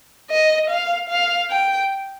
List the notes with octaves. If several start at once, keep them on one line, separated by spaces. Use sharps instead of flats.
D#5
F5
F5
G5